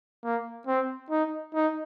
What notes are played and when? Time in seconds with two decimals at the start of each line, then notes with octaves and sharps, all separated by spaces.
0.24 A#3
0.67 C4
1.10 D#4
1.54 D#4